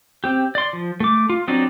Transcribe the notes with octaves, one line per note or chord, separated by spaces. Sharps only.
C4 G4
D5 C6
F3
A3 D6
F4
F#3 C4 D4 D#4 D5